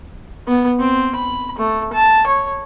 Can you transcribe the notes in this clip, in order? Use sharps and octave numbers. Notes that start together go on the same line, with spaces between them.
B3
C4
B5
A3
A5
C#5